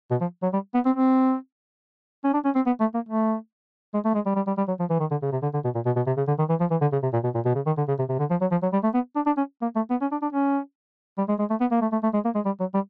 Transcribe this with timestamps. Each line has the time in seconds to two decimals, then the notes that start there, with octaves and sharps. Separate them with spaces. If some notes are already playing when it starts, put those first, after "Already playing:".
0.11 B2
0.21 F3
0.43 F#3
0.53 G3
0.74 B3
0.85 C4
0.96 C4
2.24 C#4
2.34 D4
2.45 C#4
2.55 C4
2.66 B3
2.80 A3
2.94 A#3
3.09 A3
3.94 G#3
4.05 A3
4.15 G#3
4.26 G3
4.36 G3
4.47 G3
4.57 G3
4.68 F#3
4.80 F3
4.90 E3
5.00 D#3
5.11 D3
5.22 C#3
5.32 C3
5.43 D3
5.54 D3
5.64 B2
5.75 A#2
5.86 B2
5.96 B2
6.07 C3
6.17 C#3
6.28 D3
6.39 D#3
6.49 E3
6.60 F3
6.71 E3
6.81 D3
6.92 C#3
7.03 C3
7.13 A#2
7.24 B2
7.35 A#2
7.45 B2
7.55 C#3
7.66 D#3
7.78 D3
7.88 C#3
7.99 C3
8.09 C3
8.19 D3
8.30 F3
8.41 F#3
8.51 F3
8.63 F#3
8.73 G3
8.84 A3
8.94 B3
9.16 D4
9.26 D4
9.37 C#4
9.62 A#3
9.76 A3
9.91 B3
10.01 C#4
10.12 D4
10.22 D4
10.33 C#4
11.18 G3
11.29 G#3
11.39 G#3
11.50 A3
11.60 B3
11.71 A#3
11.82 A3
11.92 A3
12.03 A3
12.14 G#3
12.25 A#3
12.35 G#3
12.45 G3
12.60 F#3
12.74 G3